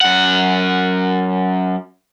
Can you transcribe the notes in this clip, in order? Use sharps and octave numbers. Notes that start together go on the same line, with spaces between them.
F#2 F#5